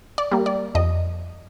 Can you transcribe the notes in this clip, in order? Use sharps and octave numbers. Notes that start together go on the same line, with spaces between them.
D5
G3 A#3
D5
F2 D#5